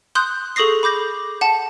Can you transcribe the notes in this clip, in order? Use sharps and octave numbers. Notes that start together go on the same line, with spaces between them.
C6 D#6 F#6 G6
G#4 A4 C#6 D#6 A#6 C7
B5 D6 G6 A#6
F#5 A5